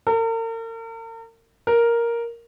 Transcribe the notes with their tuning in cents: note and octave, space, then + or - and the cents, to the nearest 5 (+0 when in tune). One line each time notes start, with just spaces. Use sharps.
A#4 -40
A#4 +5